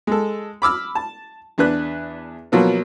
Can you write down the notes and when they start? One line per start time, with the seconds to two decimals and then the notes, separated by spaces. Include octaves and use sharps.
0.07 G#3 A4
0.62 B5 D6 E6 F6
0.95 A5
1.58 E2 D4 B4 F#6
2.52 B2 F3 F#3 A#3 B3